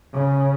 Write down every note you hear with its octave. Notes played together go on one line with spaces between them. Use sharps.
C#3